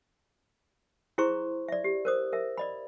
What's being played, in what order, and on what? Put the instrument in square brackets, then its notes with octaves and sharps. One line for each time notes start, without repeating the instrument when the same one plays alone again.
[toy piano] E4 G#4 C5 A#5 C6 C#6
D5 E5
G4
A#4 C5 D#6
A#4 E5
D5 D#5 B5